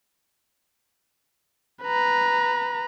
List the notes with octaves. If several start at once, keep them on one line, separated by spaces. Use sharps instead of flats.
B4 A#5